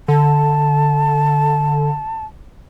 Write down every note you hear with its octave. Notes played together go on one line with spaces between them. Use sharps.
D3 A5